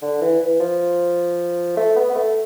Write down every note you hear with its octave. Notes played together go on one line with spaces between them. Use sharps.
D3
E3
E3
F3
A3
B3
B3
A3